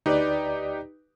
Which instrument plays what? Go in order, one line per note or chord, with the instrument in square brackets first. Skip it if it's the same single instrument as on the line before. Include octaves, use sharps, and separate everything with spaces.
[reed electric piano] D2 D5 [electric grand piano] D#4 G4 B4